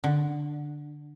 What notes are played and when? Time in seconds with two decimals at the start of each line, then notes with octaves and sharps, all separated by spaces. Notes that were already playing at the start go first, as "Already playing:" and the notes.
0.04 D3